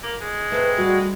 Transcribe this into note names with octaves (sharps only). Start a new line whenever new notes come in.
A#3
G#3
A3 C4 B4
G3 F#4